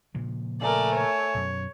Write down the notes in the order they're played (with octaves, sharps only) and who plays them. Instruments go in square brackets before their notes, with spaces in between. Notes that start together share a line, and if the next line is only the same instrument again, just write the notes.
[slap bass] A#2 C#3 F3
[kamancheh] A3 G#5 [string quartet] A#4 D5
[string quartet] C#5
[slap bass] F#2 B2